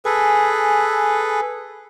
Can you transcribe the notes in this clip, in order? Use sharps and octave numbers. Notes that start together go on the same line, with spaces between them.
G#4 A4 B4 G#5